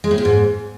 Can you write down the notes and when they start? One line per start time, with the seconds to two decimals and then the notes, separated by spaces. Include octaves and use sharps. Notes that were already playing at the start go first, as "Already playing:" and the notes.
0.04 G#3
0.11 A2
0.18 A#2
0.25 G#2